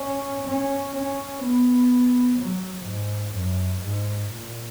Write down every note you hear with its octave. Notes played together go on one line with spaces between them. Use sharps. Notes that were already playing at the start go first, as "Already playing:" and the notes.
Already playing: C#4
C#4
C#4
B3
F#3
G#2
F#2
G#2
A#2